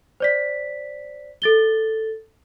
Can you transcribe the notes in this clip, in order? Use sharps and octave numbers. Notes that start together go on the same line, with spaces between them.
C5 D5 B6
A4 A6 G7